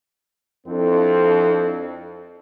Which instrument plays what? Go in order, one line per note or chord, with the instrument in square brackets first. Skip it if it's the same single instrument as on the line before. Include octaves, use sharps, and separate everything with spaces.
[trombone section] F2 C4 [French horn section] D4 E4 A4